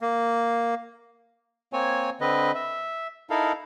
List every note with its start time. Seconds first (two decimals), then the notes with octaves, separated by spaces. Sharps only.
0.01 A#3
1.73 A#3 C4 C#5 G#5
2.21 D3 C4 B4 D#5
2.55 E5
3.30 D#4 E4 A4 A#4 F5